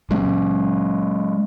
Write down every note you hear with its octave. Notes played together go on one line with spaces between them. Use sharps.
F#3 G#3 C#4